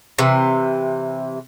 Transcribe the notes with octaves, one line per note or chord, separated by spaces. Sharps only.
C3 E3